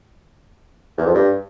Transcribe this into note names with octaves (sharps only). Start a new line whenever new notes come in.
E2
F2
G2